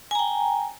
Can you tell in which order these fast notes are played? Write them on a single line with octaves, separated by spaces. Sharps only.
G#5 A#5 G5